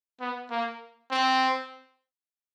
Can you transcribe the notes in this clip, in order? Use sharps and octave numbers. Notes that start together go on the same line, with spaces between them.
B3
A#3
C4